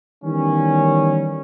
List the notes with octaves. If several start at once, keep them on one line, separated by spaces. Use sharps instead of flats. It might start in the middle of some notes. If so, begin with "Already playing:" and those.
D#3 E3 G3 B3 C#4